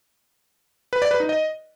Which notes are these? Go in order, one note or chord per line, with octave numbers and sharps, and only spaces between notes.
B4
D5
B4
D#4
D#5